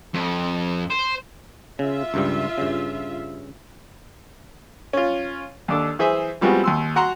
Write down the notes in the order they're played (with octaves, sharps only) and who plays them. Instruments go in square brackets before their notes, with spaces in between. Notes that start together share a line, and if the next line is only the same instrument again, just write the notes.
[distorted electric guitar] F2
C5
[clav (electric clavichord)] C#3 [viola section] F4 E5
[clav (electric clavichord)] C#2 G2 G3
G2 C#3
[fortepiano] C#4 F4
D#2 D4 A4
E3 G#4 C5 E5
F3 G3 G#3 B3 C4 F#4
D#2 C6 E6
F#4 F#5 A#5 C6